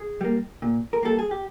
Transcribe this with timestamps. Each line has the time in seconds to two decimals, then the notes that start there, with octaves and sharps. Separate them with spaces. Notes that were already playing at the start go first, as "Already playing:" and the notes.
Already playing: G#4
0.21 G3 A#3
0.62 A#2
0.93 A#4
1.03 G3 A#3 A4
1.19 G#4
1.31 G4